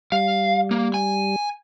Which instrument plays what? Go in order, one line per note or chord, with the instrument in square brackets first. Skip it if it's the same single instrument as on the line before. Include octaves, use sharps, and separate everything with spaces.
[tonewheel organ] G3 [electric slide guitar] F5
[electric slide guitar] A#3
G#5